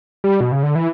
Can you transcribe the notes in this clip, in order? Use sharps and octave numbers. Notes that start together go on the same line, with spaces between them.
G3
B2
C#3
D3
E3